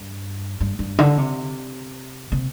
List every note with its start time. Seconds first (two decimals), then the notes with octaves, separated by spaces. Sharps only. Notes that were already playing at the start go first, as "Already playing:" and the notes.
Already playing: G2
0.60 G2
0.79 G2
0.98 D3
1.18 C3
2.32 C3